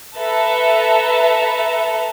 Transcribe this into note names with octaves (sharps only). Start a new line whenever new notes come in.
A4 B4 E5 A5 A#5